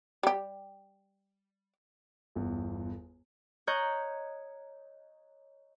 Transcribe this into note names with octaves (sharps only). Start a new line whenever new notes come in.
G3 G4
G1 E2
C#5 D#5 A#5 F#6 G6